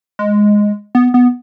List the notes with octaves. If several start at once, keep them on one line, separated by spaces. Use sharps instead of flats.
G#3
B3
B3